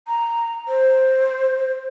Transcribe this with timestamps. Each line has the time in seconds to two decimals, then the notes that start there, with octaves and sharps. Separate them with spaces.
0.08 A#5
0.68 C5